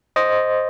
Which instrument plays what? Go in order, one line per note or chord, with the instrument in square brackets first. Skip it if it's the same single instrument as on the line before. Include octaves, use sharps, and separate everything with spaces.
[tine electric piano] C5 D#5